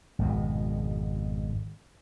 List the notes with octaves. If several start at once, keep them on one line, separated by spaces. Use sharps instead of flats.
G#1 F2 B2